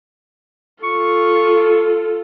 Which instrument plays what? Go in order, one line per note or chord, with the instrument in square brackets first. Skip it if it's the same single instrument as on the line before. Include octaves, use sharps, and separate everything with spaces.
[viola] F4 A4 [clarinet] C#6